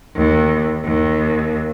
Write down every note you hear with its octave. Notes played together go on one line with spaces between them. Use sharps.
D#2
D#2